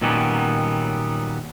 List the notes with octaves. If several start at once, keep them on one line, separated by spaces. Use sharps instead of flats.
A#2 D#3 F#3 G3 B3 C#4